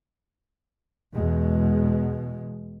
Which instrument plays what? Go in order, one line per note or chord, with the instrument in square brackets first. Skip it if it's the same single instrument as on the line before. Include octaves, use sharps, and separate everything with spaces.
[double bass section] E2 B2 G#3